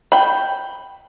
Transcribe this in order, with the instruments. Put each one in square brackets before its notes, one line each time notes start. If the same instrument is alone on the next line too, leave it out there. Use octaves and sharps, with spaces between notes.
[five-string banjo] G5 B5